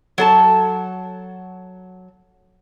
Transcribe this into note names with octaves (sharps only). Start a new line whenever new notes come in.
F#3 A4 A5